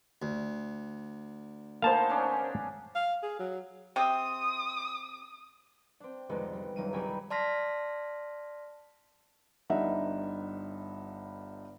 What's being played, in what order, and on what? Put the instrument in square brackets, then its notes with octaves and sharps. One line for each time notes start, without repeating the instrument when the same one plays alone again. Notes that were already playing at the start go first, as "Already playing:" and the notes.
[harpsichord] D2
[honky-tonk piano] A#3 C5 [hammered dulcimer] B3 D#4 G#4 [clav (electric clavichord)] F5 A5
[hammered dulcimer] C#4 D4
[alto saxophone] F5
G#4
F#3
[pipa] C3 C4 [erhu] D#6
[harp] C4 D4
C2 F2 D3 D#3 G#3 B3
G3
F#1 D#3 D#7
C2 F#3 G4 A#4 G#5 B5
[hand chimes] D5 A5 C6 F6 A#6 B6
[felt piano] G1 G2 G3 D#4 E5 F#5